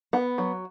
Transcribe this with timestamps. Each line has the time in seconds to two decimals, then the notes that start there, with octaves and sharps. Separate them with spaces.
0.13 B3
0.38 F#3